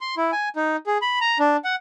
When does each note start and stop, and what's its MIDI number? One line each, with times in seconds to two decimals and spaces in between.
0.01 0.15 84
0.17 0.31 64
0.32 0.49 80
0.56 0.76 63
0.87 0.98 68
1.02 1.19 83
1.21 1.38 82
1.39 1.57 62
1.65 1.75 78